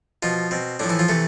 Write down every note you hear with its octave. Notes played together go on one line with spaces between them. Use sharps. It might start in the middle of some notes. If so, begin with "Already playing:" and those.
B2 F3 F4
B2 C4
A2 F3 D4
E3 E4
F3 F4
C3 E3 A3 A4